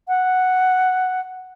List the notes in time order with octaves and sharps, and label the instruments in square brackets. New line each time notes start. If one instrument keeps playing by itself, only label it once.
[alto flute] F#5